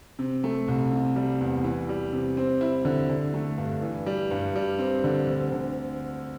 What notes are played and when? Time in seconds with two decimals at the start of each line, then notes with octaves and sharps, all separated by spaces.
0.19 C3
0.44 A3
0.68 C2
0.92 C3
1.16 G3
1.40 E2
1.64 E3
1.89 G3
2.13 C3
2.37 C4
2.61 E4
2.85 D3
3.09 D3
3.34 A3
3.58 G2
3.82 E3
4.06 G3
4.31 G2
4.56 G3
4.79 C4
5.04 D3
5.27 D2
5.52 D3